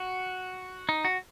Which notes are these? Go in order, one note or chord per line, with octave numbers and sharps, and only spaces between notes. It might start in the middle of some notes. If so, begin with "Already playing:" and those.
Already playing: F#4
D#4
F#4